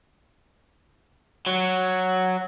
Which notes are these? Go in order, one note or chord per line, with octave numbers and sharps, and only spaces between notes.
F#3